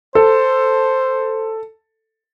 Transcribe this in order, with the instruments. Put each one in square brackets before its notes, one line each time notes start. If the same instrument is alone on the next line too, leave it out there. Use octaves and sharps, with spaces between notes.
[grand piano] A4 [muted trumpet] C5